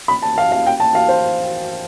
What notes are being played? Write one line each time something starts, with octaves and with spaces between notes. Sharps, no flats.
B5
A5
F5
F5
G5
A5
F5
C5